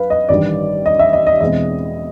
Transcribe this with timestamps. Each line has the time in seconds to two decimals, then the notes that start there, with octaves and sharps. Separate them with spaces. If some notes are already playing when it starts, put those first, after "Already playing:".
Already playing: F#3 B4 F5
0.10 D#5
0.29 A1 G2 D#3 G3 D5
0.86 D#5
0.99 E5
1.13 D#5
1.27 D#5
1.40 E2 B2 G#3 C4 D#5